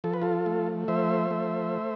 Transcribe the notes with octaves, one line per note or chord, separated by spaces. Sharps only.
F3 A4
B4
F4 A4
A3
F3 C5 E5
A3